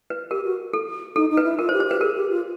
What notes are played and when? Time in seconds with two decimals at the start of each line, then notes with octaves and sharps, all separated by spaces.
0.10 B4
0.30 G4 A#4
0.45 F#4
0.73 A4
1.16 D#4 A4
1.30 D#4
1.37 B4
1.44 E4
1.59 F4 A#4
1.69 C5
1.73 G4
1.80 C5
1.87 G4 B4
2.01 G#4 A#4
2.16 G4
2.30 F4